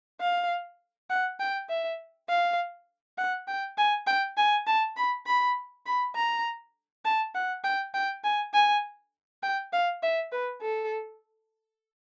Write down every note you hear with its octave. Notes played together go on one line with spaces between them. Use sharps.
F5
F#5
G5
E5
F5
F#5
G5
G#5
G5
G#5
A5
B5
B5
B5
A#5
A5
F#5
G5
G5
G#5
G#5
G5
F5
E5
B4
A4